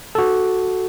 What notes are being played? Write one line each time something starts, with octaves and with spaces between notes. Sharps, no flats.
F#4 A4